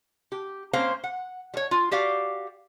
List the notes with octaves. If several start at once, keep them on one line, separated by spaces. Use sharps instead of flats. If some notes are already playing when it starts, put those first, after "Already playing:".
G4
A#3 C4 C#4 C5 F5
F#5
G3 C#5
F4
F#4 G4 D5 F5